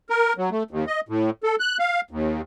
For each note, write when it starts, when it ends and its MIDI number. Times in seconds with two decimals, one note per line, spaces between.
0.10 0.33 70
0.38 0.50 54
0.51 0.63 57
0.71 0.85 39
0.87 1.00 75
1.09 1.30 45
1.43 1.56 69
1.60 1.77 90
1.79 2.01 77
2.11 2.41 39